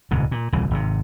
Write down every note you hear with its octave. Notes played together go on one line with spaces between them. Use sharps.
D#1 C#2 G#2 C3
A#2
D#1 C2 C#3 E3
G#1 C3